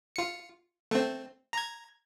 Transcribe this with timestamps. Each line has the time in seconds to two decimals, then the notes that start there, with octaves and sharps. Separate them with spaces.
0.16 F4 C#7
0.91 A3 C4
1.53 A#5 G#6